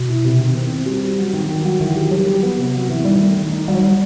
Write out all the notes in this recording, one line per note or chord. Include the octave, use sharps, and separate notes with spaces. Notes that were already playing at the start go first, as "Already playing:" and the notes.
Already playing: B2
E4
C3
D#3
C4
C4
G3
G3
F#3
D#3
D#3
F#3
D#3 E3
G4
F#3 G3
G4
B3
C3
F#4
E3
D#3 G3
A3
D#3
D#4
G3 F#4
F#3
G3 F#4